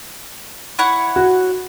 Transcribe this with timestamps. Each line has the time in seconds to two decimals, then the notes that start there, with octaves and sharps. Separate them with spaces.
0.79 E4 C#5 F#5
1.16 F#4